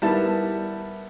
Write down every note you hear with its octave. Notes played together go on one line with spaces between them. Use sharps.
D#3 G3 B3 E4 A5